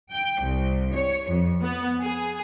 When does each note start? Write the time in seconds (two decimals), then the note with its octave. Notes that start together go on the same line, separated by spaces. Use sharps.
0.12 G5
0.42 C2
0.95 C#5
1.29 F2
1.62 B3
2.01 G#4